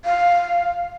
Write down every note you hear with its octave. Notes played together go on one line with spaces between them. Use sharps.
F5